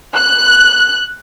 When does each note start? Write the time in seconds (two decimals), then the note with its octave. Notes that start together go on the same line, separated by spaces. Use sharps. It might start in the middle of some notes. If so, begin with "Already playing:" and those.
0.16 F#6